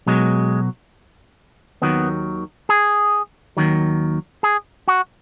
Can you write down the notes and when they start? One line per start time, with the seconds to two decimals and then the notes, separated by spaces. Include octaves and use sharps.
0.07 B1 B2 F#3 G#3
1.82 D#2 D#3 F#3 B3
2.69 G#4
3.57 D#2 D#3 F#3
4.43 G#4
4.88 F#4